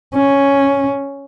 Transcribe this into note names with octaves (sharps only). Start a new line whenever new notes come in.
C#4